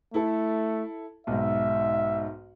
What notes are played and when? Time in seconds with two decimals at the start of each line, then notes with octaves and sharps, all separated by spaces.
0.14 A3 E4 A4
1.27 B1 G#2 E5